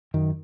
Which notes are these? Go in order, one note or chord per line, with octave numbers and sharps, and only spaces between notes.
F#2 D#3